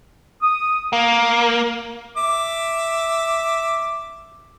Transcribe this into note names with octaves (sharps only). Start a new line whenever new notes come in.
D#6
A#3
E5 D6